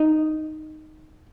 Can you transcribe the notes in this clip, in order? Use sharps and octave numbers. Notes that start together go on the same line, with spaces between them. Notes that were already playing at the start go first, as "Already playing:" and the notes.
Already playing: D#4